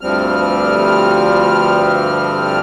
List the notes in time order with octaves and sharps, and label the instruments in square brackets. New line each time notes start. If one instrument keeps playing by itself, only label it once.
[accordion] D2 G2 F3 G3 C4 F6